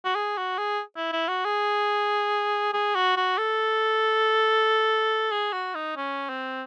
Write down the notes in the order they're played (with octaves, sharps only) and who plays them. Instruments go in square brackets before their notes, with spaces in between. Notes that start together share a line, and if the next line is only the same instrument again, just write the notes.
[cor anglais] F#4
G#4
F#4
G#4
E4
E4
F#4
G#4
G#4
F#4
F#4
A4
G#4
F#4
D#4
C#4
C4